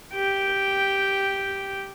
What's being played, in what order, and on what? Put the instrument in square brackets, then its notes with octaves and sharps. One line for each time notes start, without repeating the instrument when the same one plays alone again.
[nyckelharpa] G4 G5